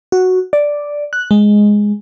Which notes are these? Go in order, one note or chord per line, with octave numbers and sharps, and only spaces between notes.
F#4
D5
F#6
G#3